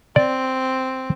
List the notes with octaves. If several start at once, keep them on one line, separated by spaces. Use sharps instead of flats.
C4 D5